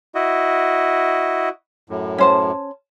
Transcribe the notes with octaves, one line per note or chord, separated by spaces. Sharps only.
E4 F#4 D#5
F#2 A2
C#4 C5 A5